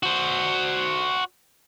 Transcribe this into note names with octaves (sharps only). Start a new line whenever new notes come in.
F#4 C5